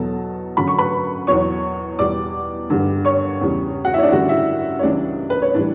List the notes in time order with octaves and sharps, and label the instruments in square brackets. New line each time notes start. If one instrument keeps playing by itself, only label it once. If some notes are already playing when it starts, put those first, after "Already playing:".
Already playing: [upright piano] E2 B2 F#3 A4 A5
F#2 D3 F#3 B5
C#6
B4 B5
E2 B2 F#3 C#5 C#6
E2 B2 G3 D5 D6
G2 D3 G3
C#5 C#6
E2 C#3 G3
F#4 F#5
E4 E5
C#5
D4 D5
F#2 D3 G3 F#4 F#5
E4 E5
C#5
C#2 C#3 E3 G3 D4 D5
B4
C#5
A2 E3 G3 D4 D5